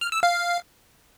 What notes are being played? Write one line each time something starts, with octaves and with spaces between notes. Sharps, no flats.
F6
E6
F5